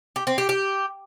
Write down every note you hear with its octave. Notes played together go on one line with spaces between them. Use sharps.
G4
C4
G4
G4